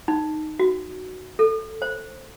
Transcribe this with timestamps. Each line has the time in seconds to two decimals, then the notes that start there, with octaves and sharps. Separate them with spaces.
0.08 D#4
0.59 F#4
1.39 A4
1.82 C5